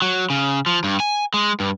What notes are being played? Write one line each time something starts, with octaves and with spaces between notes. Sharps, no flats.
F#3
C#3
F3
G2
G#5
G#3
G2